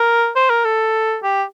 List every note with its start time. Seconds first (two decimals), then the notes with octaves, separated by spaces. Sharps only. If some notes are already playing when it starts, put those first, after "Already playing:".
Already playing: A#4
0.36 C5
0.50 A#4
0.65 A4
1.23 G4